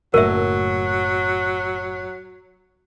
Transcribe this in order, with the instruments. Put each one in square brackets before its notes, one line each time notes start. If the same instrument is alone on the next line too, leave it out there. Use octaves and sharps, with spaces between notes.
[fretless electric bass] F#1 A2 [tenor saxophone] F#3 [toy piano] A#4 E5